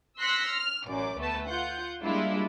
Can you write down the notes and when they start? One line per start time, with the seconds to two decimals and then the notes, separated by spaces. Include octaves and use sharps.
0.20 C6 E6 F#6 A#6 B6 C#7
0.52 F6
0.88 A1 F#2 D5 D6
1.19 D2 A3 B3 B4 A5
1.49 F4 F#5 G6
2.03 G3 G#3 A#3 D4 E4 F4